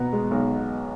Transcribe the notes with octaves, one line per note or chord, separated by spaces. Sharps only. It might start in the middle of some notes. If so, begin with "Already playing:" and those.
Already playing: B2 B3 A#5
G#3
B1